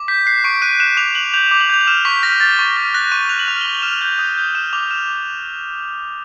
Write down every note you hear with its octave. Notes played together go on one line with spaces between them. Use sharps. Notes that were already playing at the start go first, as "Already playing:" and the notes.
Already playing: D6
G6 B6
F#6 C7
C#6 D7
F#6 D#7
F#6 E7
D6 F7
F#6 F#7
G6 F7
D6
F#7
G6 F7
F7
F6 E7
C#6 B6
F6 A#6
F6 A6
C#6
F6
F#6 A#6
C#6 D#7
F#6 F7
F#7
F6 F7
C#6 G7
F#7
F6 E7
F7
G6
D#6
G6
F6 E7
D6 F7
F6 E7